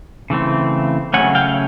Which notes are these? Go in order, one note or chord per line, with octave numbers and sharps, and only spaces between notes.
C#3 E3 A3 C4
C#3 F#3 A3 C#4 F#5 G#5
F5 G5